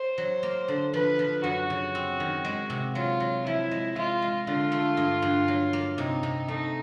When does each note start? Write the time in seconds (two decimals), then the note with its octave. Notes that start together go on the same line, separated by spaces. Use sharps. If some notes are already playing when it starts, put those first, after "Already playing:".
Already playing: C5
0.18 F#3
0.43 A#3
0.68 D3
0.93 F3 B4
1.19 F3
1.44 F#2 F#4
1.70 C#3
1.95 C4
2.20 D#3
2.45 G#3
2.70 C3
2.95 F#3 F4
3.20 F#3
3.46 F3 E4
3.71 G#3
3.96 G#3 F4
4.22 G#3
4.47 D3 F4
4.72 A3
4.97 G2
5.22 G2
5.48 F#3
5.73 A#3
5.98 C3 D#4
6.23 C3
6.48 A3 D#4